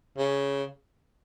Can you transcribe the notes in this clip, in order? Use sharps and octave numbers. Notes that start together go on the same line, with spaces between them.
C#3